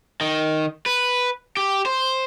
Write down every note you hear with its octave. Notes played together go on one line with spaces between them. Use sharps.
D#3
B4
G4
C5